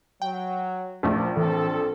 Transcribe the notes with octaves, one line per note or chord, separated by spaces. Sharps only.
F#3 G5
A#1 E2 A#2 F3 A3
A2 E3 C4 A4